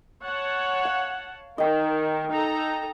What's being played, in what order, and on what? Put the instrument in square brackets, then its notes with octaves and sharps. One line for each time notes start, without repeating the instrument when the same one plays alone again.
[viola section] C#5 F#5 A5
[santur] F5
[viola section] D#3 A#4 [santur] D#5 G5
[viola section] D#4 A4 A#5